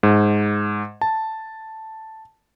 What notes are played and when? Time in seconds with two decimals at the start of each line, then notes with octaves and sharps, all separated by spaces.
0.03 G#2
1.01 A5